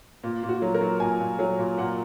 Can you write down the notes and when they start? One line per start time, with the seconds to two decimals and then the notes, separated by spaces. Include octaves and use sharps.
0.24 A#2
0.43 A#2
0.49 F#4
0.62 F#3
0.74 A#4
0.81 F#3
1.00 A#2 G#5
1.20 A#2
1.39 F#3
1.59 A#2
1.78 A#2 F#5